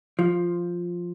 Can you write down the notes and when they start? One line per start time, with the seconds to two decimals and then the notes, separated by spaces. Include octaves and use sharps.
0.19 F3